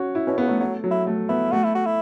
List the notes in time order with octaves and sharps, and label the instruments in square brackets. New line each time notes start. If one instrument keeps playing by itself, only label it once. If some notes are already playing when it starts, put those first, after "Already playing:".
Already playing: [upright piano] C#4 F#4
E4
[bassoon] B2 [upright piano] C#4
[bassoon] C#3 [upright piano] B3
[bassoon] F#3 [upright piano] A3
[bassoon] F#3 [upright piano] A3
[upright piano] F#3
[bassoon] E4
[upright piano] A3
[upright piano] B3 [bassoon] E4
[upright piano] A3 [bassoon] F#4
[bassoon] E4
F#4
E4